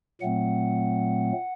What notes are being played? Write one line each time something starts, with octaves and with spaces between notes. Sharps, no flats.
A#2 F#3 A3 C4 F#5